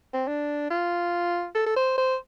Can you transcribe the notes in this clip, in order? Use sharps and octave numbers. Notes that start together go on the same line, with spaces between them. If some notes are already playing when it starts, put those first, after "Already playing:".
C4
D4
F4
A4
A4
C5
C5